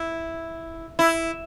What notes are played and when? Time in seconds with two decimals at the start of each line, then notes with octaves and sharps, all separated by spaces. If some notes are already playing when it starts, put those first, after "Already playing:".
Already playing: E4
0.99 E4